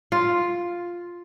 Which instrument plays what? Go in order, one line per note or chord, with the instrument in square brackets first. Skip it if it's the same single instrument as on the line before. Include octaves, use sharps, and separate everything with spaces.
[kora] F4